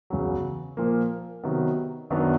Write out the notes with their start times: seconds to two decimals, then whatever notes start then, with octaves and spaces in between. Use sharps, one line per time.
0.10 E2 C#3 F#3
0.77 A#2 F3 A#3
1.44 C3 D#3 F#3 B3
2.10 F#2 D#3 F#3 B3 D4